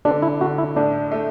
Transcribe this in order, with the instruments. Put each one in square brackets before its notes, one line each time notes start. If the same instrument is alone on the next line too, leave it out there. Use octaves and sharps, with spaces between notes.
[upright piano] D3 [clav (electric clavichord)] D4
[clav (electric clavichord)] E4
[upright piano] D3 [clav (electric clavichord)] F#4
[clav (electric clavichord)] E4
[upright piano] A2 [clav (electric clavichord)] D4
[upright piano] A3